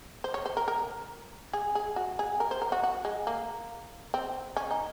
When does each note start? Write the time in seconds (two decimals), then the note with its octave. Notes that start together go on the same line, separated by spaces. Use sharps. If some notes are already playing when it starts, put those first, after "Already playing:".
0.24 C5
0.34 C#5
0.46 C5
0.57 A#4
0.68 A#4
1.53 G#4
1.75 G#4
1.96 F#4
2.19 G#4
2.40 A#4
2.51 C5
2.62 A#4
2.72 F#4
2.83 F#4
3.05 G#3
3.27 A#3
4.14 C4
4.57 C#4
4.71 D#4